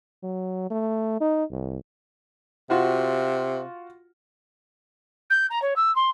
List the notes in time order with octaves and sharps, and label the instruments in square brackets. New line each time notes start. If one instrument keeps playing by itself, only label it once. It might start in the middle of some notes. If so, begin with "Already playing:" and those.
[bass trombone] F#3
A3
D#4
C2
[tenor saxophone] C3 [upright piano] F4 F#4 F#5
[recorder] G6
A#5
C#5
E6
C6